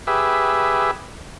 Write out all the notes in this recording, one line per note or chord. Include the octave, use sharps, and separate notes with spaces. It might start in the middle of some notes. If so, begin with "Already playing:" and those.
G4 G#4 B4 E5